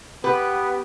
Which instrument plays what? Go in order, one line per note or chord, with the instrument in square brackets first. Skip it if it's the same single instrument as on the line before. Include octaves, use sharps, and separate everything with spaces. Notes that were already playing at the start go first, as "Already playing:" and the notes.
[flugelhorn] B3 [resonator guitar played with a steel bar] G4 B4